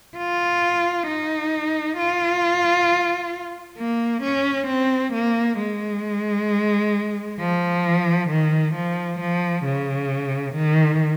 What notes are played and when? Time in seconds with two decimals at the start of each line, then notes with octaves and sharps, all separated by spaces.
0.17 F4
1.08 D#4
1.98 F4
3.78 A#3
4.23 C#4
4.68 C4
5.14 A#3
5.58 G#3
7.40 F3
8.30 D#3
8.75 F3
9.20 F3
9.65 C#3
10.55 D#3